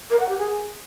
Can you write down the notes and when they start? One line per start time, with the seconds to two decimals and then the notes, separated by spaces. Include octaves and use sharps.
0.10 A#4
0.20 F#5
0.29 G4
0.38 G#4